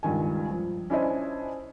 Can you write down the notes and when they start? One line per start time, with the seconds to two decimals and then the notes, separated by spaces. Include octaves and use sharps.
0.03 C#2 G2 D#3 G#5
0.51 F3
0.90 C#4 D4 E4 C5 D#5 G#5